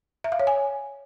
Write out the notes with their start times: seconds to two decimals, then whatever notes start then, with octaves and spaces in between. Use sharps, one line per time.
0.24 E5
0.32 F5
0.40 C#5
0.47 G#5